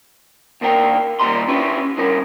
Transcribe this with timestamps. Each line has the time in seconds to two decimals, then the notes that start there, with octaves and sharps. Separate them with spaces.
0.61 D#2 A#3 D4 A#4 G5
1.20 D#3 G3 A#3 D#5 A#5 C6
1.48 C#4 D4 E4 G4 B4
1.97 D2 G2 C#3 C#4 A#4